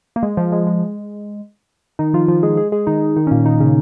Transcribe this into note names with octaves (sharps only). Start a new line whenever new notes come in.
A#3
G#3
F3
G#3
G#3
D#3 D#4
F3 F4
F3 F4
G#3 G#4
G#3 G#4
G#3 G#4
D#3 D#4
D#3 D#4
C#4
A#2 A#3
D#3 D#4
C#3 C#4